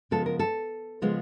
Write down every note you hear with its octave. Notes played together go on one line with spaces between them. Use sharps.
C#3 F3 G#3 B3 A4
A#4
A4
C#3 F3 G#3 B3